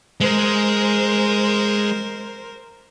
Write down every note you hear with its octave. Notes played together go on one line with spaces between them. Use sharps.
G#3 A#4 C5